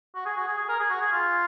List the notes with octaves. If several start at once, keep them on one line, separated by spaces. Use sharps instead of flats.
F#4
G#4
F#4
G#4
G#4
A#4
G#4
F#4
G#4
F4